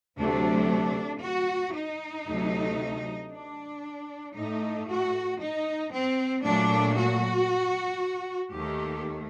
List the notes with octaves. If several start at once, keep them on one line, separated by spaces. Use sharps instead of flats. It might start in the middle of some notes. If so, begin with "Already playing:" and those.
D2 C3 F#3 A3 D4
F#4
D#4
D2 C3 F#3 A3
D4
A2 A3 D#4
F#4
D#4
C4
A#2 F#3 A3 D4
F#4
D#2 D#3 A3 G4